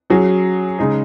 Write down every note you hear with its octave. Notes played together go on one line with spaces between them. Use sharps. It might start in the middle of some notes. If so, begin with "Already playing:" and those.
F#3 C#4 G#4
C#3 G#3 D#4 G#4